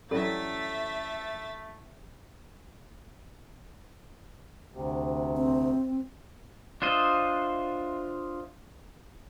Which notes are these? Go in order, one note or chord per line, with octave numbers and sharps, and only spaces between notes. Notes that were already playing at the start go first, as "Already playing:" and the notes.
E3 F#3 G3 A3 C#4 A4 E5 A6
D2 C3
C4
D4 F4 C5 D#5 E5